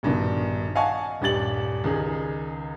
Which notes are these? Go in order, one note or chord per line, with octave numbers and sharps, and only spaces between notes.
A#1 G2 B2 D#3
D#5 F5 F#5 G#5 A5 C#6
D#1 G2 G4 A6 F#7
C#2 D#3 D#4 G#4